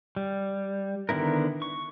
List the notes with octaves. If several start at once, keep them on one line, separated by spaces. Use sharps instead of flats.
G3
D3 D#3 B3 E4 A#4
C#6